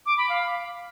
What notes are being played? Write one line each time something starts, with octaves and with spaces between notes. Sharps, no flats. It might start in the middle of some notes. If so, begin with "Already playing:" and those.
D6
B5
F5